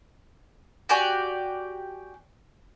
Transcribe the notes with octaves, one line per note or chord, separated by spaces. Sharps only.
F#4 G4 D5 G#5